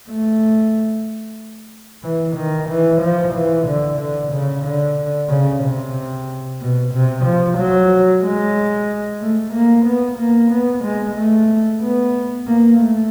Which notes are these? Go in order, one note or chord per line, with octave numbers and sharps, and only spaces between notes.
A3
E3
D#3
E3
F3
E3
D3
D3
C#3
D3
C#3
C3
B2
C3
F3
F#3
G#3
A3
A#3
B3
A#3
B3
G#3
A3
B3
A#3
A3